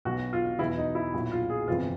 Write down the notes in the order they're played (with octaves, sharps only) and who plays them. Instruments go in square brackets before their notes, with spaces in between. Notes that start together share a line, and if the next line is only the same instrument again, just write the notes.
[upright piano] B1 B2 F#3 F#4
F4
E2 B2 F#3 E4
D#4
E4
B1 A#2 F#3 E4
F4
G#4
G1 F2 C3 E3 F4